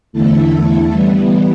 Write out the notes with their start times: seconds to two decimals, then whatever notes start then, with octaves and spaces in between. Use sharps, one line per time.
0.13 E2 D3 A3 E4 A4
0.88 E3 G3 B3